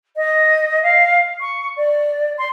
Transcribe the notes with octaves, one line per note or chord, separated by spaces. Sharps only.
D#5
F5
C#6
D5
C6